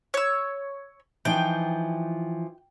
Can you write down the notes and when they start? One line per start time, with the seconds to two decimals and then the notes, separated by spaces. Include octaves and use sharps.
0.14 C#5 E6
1.25 E3 F3 D#4 G5